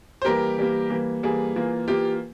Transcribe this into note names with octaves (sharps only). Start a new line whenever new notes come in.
C5
E3 G3 A#3 G4 A#4
E3 G3 A#3
E3 G3 A#3
E3 G3 A#3 G#4
E3 A#3 F4
E3 A#3 F4 G4